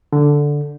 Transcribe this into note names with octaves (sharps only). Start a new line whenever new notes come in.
D3